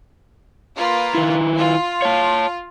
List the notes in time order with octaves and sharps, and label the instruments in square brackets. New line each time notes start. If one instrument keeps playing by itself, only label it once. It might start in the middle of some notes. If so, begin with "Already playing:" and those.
[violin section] A#3 F4 B4
[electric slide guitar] D#3 E4
[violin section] F4
[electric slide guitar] C#5 A5